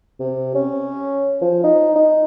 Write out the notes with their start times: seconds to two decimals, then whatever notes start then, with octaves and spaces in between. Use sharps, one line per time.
0.20 C3
0.55 C#4
1.42 F3
1.64 D#4
1.96 D#4